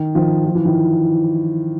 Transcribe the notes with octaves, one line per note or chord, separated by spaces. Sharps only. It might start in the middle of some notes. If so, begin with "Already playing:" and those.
Already playing: D#3
D#3 F3
F3
E3
D#3 F3